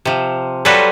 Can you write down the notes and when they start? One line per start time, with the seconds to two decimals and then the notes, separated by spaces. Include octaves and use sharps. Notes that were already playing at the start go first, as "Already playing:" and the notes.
0.05 C3 F3
0.65 F#3 G3 F4 F#4 A4 B4